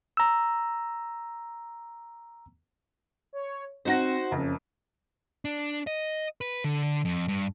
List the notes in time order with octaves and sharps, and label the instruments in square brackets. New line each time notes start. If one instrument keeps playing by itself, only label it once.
[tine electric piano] A#5 E6
[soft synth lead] C#5
[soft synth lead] C4 [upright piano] D#4 F#5 A#6 [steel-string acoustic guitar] F#4 C5
[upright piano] F#1 F2 [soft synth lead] C#3
[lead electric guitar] D4
D#5
B4
D3
F2
G2